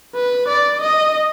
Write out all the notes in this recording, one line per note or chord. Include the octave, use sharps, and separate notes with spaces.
B4
D5
D#5